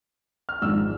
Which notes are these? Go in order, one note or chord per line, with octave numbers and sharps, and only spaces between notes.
F6
G#1 G#2 F3 G#3 D4 E6